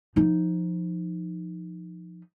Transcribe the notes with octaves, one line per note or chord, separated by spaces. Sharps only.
F3 D#4